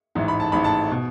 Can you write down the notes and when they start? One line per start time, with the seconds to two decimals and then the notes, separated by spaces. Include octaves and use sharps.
0.15 A1 G#2 E3
0.28 B5
0.40 A5
0.52 A1 G#2 E3 B5
0.64 A5
0.92 B2